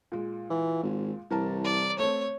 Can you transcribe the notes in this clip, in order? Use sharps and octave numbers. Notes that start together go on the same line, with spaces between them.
A#2 G#3
E3
G#1
C2 E3 A#4 A5
D5
A3 C4 C#5